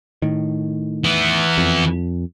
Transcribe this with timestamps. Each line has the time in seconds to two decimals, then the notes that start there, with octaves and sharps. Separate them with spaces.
0.22 A2 D#3
1.04 E3 B3
1.58 F2